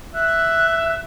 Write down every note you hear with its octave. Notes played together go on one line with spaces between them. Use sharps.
E5 F#6